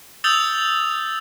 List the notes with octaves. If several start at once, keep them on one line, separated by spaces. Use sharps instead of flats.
D#6 E6 G6 A6 F7 G7